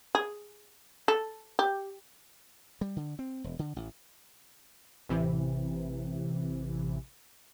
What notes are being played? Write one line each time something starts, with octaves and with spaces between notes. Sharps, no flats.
G#4
A4
G4
G3
D3
C4
E1
D3
A1
A1 C3 E3